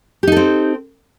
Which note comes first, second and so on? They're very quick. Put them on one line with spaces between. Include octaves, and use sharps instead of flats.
G4 D#4 A4 C4